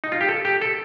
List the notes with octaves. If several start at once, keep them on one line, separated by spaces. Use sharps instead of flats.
D#4
F4
G4
A4
G4
A4